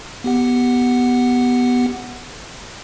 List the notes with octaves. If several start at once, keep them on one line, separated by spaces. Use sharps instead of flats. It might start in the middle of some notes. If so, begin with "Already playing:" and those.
B3 G4 F#5